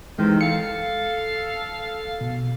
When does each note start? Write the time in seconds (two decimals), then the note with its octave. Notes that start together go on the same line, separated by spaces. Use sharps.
0.19 C3 D#3 E3 G#3
0.41 A4 F5 C#7
2.21 B2